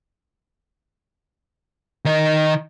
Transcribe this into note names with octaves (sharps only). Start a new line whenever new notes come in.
D#3 D#5